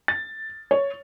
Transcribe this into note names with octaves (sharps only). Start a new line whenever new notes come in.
A6
C#5